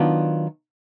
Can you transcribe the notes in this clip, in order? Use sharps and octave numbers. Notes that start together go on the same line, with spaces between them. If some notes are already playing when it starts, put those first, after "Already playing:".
Already playing: D#3 F#3 B3 D4 F4